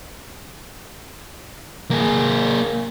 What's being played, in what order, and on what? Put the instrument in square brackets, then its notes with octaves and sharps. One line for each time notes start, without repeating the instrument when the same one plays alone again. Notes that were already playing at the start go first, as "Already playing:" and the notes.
[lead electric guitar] A#3 G#4